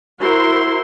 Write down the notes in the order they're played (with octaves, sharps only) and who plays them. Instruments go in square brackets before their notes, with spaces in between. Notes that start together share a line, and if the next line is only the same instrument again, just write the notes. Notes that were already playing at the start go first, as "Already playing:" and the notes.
[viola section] E4 F#4 A#4 C5 C6